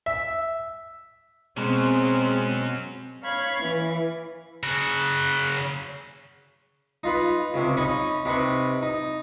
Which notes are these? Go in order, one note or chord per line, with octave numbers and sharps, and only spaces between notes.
E5
B2 F#3 G#3 C4 C#4
C#5 F5 B5 G#6
E3
C#3 F#4
D#4 F4 B4
C#2 C3 C#4
C#4 D#4 B5 C#6
C3 D#4 B4 C#6
D#4